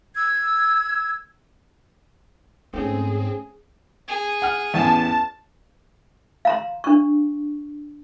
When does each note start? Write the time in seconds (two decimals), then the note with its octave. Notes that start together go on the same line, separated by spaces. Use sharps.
0.15 E6 G#6
2.73 G#2 A3 C4 C#4 G#4
4.08 G#4
4.42 F#5 F6
4.74 A1 E2 A5
6.45 F5 A#5 C6
6.84 D4 C#6